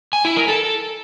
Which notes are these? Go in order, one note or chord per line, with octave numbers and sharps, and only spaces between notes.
G#5
E4
A#4
A4